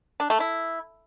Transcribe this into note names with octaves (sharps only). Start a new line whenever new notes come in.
D4
A3
E4